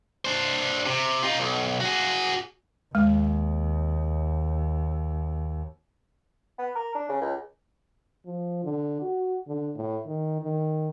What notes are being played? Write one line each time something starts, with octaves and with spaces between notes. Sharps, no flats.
D4 C5
C3
D#4 F4
B1
F#4 G#4
D#2 G#3
B3
A#4
D4
C#3
C#2
F3
D3
F#4
D3
A2
D#3
D#3